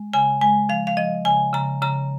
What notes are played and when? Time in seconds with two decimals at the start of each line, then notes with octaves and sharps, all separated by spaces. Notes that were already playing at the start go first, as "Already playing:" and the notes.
Already playing: G#3
0.14 C#3 G#5
0.41 G#3 G#5
0.69 F3 F5
0.87 F5
0.97 F3 D#5
1.25 C#3 G#5
1.53 C#3 A#5
1.81 C#3 A#5